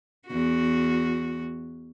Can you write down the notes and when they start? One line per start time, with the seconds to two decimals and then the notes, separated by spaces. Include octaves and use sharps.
0.27 E2 F#4